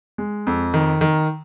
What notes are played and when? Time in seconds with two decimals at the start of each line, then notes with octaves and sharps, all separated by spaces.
0.18 G#3
0.47 F2
0.74 D#3
1.01 D#3